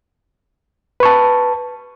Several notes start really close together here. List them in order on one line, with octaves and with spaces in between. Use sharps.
B4 C#6 A5